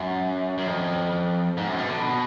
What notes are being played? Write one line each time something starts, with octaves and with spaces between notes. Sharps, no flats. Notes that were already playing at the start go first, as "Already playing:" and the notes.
Already playing: F#2
F#2
F2
G#2
F#2
B2
D3
B2